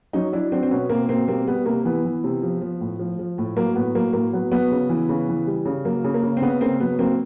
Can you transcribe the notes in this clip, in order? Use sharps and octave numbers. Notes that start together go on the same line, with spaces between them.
F#3 C#4 D#4
F#3 D4 E4
F#3 C4 D4
C4
B2 B3 C#4
B2 A#3 C4
B2 A#3 C4
G3 A#3 C4
G3 B3
C3 A#3
E3 B3
E3
C3
F3
F3
A2
F3
F3
A2
F#3 A#3
A2 B3
F#3 A#3
A2 A#3
F#3 B3
F#3 B3
C#3
E3
C#3
E3
G3
C#3
F#3 A#3
C#3
A#3
C#3
C4
C#3 B3
C#3 A#3 C4
F#3 B3
F#3 A#3 C4